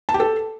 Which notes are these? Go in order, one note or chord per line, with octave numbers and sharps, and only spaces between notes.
A5
G4
A4